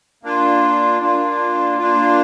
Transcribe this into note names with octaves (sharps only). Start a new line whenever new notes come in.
A#3 D4 F4
A#3 D4 F4
A#3 D4 F4